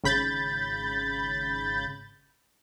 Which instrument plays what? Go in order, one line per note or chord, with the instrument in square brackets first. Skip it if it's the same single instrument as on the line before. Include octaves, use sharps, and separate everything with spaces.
[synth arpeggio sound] G#1 C#3 B5 G6 A6